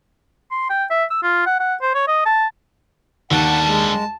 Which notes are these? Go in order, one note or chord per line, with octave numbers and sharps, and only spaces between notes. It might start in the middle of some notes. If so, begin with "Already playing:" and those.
C6
G5
E5
E6
F4
F#5
F#5
C5
C#5
D#5
A5
D#2 D3 G3 F#5 A5
G#3